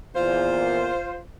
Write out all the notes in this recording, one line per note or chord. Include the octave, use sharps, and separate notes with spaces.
E2 A#2 F4 C5